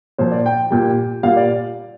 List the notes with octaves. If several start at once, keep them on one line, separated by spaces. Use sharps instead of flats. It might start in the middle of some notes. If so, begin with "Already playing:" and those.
A#2 F3 C5
D5
G5
A#2 G3 G5
A#2 G3 F5
D5